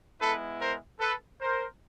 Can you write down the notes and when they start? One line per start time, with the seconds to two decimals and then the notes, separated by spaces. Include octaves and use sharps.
0.20 G#3 B3 E4 A4 B4
0.60 A#4 C5
1.00 A4 B4
1.40 A#4 C5